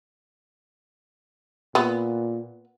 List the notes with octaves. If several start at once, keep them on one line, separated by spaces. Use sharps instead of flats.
A#2 B3